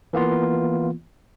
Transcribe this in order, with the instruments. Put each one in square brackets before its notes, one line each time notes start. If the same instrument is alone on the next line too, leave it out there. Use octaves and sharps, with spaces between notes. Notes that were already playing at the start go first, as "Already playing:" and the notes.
[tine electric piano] E3 A#3 B3 F4